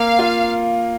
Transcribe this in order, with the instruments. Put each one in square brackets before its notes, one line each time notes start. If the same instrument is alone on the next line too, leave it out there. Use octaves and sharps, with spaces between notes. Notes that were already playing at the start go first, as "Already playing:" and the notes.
Already playing: [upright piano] A#3 [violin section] F5
[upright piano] F4